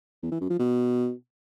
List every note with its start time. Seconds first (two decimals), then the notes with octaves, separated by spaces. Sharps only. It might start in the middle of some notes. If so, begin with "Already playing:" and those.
0.23 E2
0.32 E3
0.41 F#2
0.50 F3
0.59 B2